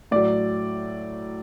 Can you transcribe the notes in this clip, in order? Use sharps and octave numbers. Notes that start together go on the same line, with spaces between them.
A2 F#3 D5